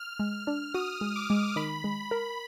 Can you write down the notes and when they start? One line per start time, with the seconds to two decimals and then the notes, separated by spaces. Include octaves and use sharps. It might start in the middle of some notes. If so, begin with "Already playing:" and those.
Already playing: F6
0.19 G#3
0.47 D4
0.74 F#4 D#6
1.01 G#3
1.16 D6
1.30 G#3
1.56 D#3 B5
1.84 G#3
2.11 A#4